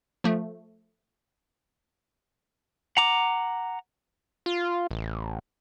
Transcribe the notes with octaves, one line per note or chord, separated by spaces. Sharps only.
F3 A3
F#5 A#5 D6
F4
A1